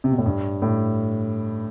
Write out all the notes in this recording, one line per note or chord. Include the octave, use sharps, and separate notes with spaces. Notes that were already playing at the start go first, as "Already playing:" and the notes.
C3
B2
A2
G2
A2